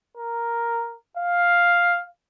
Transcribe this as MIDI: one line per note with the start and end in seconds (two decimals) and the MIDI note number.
0.17 0.95 70
1.17 2.04 77